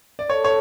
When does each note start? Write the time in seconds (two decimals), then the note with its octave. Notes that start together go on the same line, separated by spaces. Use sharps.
0.19 D5
0.30 A4 C#5
0.44 C#5